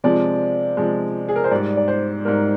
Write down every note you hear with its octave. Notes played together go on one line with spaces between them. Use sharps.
C3 F3 G#3 D5
C3 F3 G#3
G#4
A#4
C5
G#2 G3 D5
D5
C5
G#2 G3 A#4